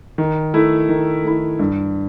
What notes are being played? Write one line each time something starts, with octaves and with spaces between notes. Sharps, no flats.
D#3
A3 E4
D#3
A3 E4
G2